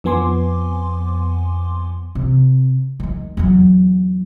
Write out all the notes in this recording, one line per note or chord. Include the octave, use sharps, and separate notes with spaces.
F2 F3 B3 G#5 C6 D6
C3
D#3 G#3
E2 F#3